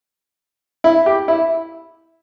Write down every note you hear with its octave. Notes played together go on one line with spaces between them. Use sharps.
E4
G4
E4